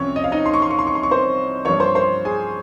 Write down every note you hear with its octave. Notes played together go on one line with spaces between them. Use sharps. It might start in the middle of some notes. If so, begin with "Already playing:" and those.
Already playing: C2 F3 C4 C#4 C#5
D#5
F5
D#4 D#5
C6
C#6
C6
C#6
C6
C#6
C6
C#6
C5 C6
G2 F3 C#5 C#6
C5 C6
C5 C6
G#4 G#5